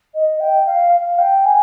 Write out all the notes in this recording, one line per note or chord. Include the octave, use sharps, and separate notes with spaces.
D#5
G5
F5
F5
G5
G#5